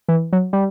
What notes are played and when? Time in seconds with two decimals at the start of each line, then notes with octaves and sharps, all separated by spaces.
0.08 E3
0.33 F#3
0.53 G3